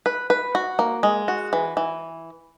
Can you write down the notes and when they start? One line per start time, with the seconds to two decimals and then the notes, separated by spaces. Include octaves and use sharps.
0.06 B4
0.30 B4
0.55 F#4
0.79 A#3
1.03 G#3
1.28 F#4
1.53 E3
1.77 E3